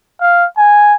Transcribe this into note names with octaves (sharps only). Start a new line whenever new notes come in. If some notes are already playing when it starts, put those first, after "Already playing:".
F5
G#5